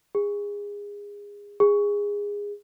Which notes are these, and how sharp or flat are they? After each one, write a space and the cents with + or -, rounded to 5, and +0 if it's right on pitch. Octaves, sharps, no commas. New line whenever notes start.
G#4 -25
G#4 -20